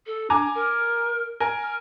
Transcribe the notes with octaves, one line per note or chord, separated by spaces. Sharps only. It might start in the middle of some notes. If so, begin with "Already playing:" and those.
A4
D4 G#5 A#5 D6
A#4
A#4 G#5
F6